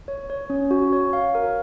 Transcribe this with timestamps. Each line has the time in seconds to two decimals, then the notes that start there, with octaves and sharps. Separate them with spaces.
0.08 C#5
0.30 C#5
0.50 C#4
0.71 F#4
0.93 C#5
1.13 F5
1.35 A#4